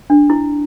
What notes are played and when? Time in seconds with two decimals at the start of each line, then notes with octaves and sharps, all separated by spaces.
0.10 D4
0.30 E4